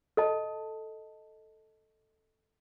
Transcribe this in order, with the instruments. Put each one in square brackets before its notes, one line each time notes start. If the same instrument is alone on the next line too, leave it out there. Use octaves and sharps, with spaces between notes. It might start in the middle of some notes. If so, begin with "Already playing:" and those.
[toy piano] A4 D#5 A5